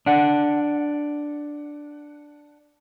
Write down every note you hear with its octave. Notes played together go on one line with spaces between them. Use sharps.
D4 F#5